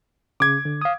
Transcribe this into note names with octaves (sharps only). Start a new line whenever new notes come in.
C#3 D6 G#6
D3
F5 D#6